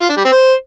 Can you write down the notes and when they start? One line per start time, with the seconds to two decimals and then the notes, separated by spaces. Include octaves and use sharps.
0.02 F4
0.10 D4
0.17 G3
0.25 C4
0.32 C5